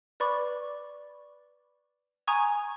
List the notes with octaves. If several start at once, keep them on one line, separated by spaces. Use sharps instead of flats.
B4 D5 B5 C#6 D6
G#5 A#5 C#6 D#6 G#6